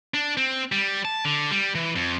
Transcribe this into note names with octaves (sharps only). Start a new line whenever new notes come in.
D4
C4
G3
A5
D3
G3
E3
F2